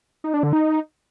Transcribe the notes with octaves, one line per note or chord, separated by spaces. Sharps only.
D#4
D4
D3
D#4